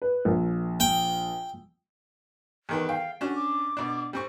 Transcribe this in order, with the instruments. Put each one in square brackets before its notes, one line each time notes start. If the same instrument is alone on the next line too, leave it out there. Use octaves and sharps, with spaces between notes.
[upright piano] B4
A#1
[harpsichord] G5
[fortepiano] E2 D#3 B4
[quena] F5 [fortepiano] G5
[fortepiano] C#4 D4 [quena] F#4
[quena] D6
[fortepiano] B2 D4
G3 C4 C#6